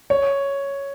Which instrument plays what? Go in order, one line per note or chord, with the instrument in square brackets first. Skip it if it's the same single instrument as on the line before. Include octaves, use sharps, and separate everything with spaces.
[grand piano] C#5